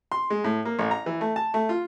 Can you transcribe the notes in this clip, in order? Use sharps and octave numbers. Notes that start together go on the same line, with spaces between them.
C6
G#3
A2
A#3
A1
A#5
E3
A3
A5
A3
F4